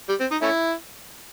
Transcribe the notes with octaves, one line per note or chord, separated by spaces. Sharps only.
G3
C4
D#4
A3 C#4 E4